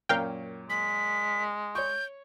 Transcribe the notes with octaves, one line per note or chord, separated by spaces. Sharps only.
F#2 A#2 C#4 A#4 F5 G5
G#3 B6
C#5 C#6 G6